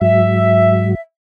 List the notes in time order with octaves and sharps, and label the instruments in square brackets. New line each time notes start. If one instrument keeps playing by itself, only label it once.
[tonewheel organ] G#2 F#3 [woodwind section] E5